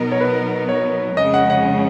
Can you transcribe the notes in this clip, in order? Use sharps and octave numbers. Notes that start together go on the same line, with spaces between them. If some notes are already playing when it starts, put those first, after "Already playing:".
Already playing: B2 F#3 B3 D#4 A#4
C#5
B4
C#5
F2 C#3 G#3 C#4 D#5
F#5
F#5